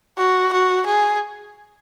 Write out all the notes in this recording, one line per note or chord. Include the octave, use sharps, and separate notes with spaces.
F#4
F#4
G#4